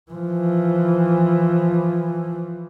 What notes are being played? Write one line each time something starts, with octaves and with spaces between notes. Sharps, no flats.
E3 F3